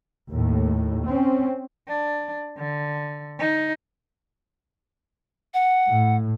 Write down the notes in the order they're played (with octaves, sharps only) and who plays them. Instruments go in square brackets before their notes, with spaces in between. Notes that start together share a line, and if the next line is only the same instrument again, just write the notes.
[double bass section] D#2 A2
C4 C#4
[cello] D4
D3
D#4
[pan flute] F#5
[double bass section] A2